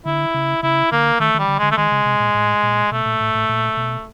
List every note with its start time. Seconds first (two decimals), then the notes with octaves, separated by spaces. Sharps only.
0.06 D3 E4
0.34 C#3
0.63 C#3 E4
0.92 D3 A#3
1.20 D#3 A3
1.34 D#3 G3
1.48 D3
1.58 D3 G#3
1.71 A3
1.77 D#3 G#3
1.92 C#3
2.06 C3
2.20 A#2
2.34 A2
2.63 A#2
2.92 B2 A3
3.06 A#2
3.21 A2
3.35 A2
3.49 A#2
3.77 B2